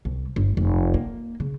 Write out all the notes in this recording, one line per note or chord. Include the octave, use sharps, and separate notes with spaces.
C2
G1
F1
A#3
C#3